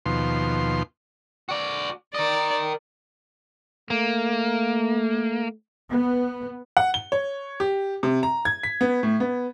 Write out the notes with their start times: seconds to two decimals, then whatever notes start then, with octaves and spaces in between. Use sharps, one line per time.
0.06 D#2 B2 F3 C6
1.49 F#4 D5
2.15 A#4 D5 D#5
3.90 A3 A#3
5.91 B3
6.77 F#5
6.94 G7
7.12 C#5
7.60 G4
8.03 C3
8.23 A#5
8.45 G#6
8.63 B6
8.81 B3
9.03 A2
9.20 B3